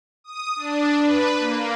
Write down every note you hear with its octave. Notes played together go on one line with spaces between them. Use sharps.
D#6
D4
B4
A#3